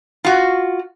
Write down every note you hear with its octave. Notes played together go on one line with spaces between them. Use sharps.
F4 F#4